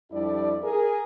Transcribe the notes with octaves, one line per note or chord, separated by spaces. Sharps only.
F2 G3 D4 E4 G4 D5
G#4 A#4